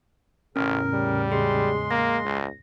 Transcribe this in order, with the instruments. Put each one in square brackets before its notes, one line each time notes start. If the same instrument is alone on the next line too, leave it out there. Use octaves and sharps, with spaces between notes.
[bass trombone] A1 [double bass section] E2 A2 C#3 [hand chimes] C#4 [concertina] A#4
[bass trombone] G3
[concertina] G#3 C6 [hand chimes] G#4
[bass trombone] A#3 [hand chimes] A#6
[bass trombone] C#2